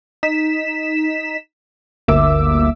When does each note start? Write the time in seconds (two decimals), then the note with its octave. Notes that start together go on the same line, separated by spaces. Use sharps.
0.23 D#4 B6 E7
2.08 G1 D2 A#3 E5 D6 E6